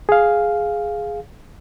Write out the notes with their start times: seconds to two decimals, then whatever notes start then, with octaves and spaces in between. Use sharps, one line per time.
0.09 G#4 F5